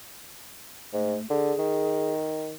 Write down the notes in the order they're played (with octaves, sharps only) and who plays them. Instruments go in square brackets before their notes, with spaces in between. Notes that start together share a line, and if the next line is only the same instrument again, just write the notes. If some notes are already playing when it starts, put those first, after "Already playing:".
[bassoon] G#2 [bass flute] A3
[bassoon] D3 [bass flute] G#4
[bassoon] D#3